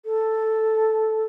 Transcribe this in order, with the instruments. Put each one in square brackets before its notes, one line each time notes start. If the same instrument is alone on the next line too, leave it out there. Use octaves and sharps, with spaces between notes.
[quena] A4